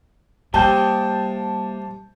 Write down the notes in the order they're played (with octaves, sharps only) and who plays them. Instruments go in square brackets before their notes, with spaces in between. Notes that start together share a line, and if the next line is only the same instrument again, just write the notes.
[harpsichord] C3 [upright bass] G3 [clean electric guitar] A#3 G5 [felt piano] A5 G6